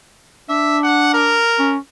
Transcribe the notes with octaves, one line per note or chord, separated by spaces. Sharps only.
D4 E5
F#5
A#4
C#4